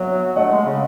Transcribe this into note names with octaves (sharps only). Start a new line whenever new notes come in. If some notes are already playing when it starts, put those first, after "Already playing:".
Already playing: F#3 C#5 E5
A3 D#5 F#5
G#3
C#3